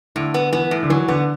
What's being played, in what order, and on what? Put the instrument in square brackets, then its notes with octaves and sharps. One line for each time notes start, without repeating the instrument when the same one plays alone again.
[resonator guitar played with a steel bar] A2 [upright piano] D3
[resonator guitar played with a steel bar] B3
[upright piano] E3 [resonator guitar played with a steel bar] B3
[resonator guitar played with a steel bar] A2
[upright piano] D3
[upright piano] E3 [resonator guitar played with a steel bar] F#3
[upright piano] D3 [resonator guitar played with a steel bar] B3